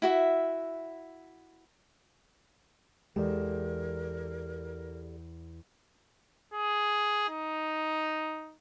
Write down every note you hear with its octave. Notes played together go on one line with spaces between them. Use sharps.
E4 F#4 E5
E2 G#3 G4 A4 A#4 D5 E7
G#4
D#4